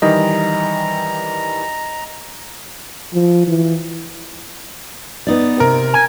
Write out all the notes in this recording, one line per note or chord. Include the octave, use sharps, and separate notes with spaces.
D#3 E3 G3 D#5 A#5
F3
E3
B3 D#4 D5
C3 A#4
G#5